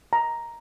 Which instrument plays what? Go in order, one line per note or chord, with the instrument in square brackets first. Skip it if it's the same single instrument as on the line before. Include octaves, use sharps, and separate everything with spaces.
[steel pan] A#5